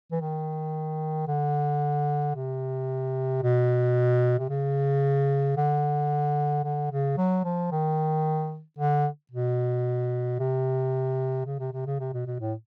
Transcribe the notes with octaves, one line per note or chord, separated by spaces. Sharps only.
E3
D#3
D3
C3
B2
C3
C#3
D3
D3
C#3
F#3
F3
D#3
D3
B2
C3
C#3
C3
C3
C#3
C3
B2
B2
A2